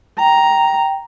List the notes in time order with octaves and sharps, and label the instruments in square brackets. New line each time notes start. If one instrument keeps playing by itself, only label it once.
[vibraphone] G5 [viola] A#5